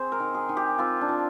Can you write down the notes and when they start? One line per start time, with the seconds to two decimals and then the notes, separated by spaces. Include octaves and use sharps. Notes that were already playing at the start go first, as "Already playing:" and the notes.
Already playing: C4 G#4 C5
0.12 A#4
0.20 D#3
0.35 G#4
0.49 D#3
0.57 G4
0.78 C4 F4
1.01 D4
1.09 F3